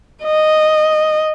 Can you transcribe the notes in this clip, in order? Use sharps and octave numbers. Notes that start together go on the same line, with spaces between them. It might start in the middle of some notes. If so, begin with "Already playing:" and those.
D#5